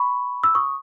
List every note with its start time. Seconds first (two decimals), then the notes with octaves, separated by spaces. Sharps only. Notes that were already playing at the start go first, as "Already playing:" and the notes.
Already playing: B5 C#6
0.43 E6
0.55 C#6 D#6